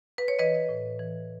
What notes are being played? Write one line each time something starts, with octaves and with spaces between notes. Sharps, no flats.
B4
C#5
E3 B4 D#5
A2
E3